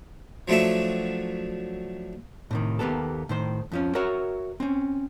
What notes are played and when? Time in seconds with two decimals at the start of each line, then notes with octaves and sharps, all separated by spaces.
0.48 F3 F#3 A3 D4 E5
2.51 A2 C3 D#3
2.79 D#2 A#3 B3 G4 A4
3.29 A2 D#3 C5
3.72 F2 F3 C#4
3.95 F#4 A#4 C#5 E5
4.60 C4 C#4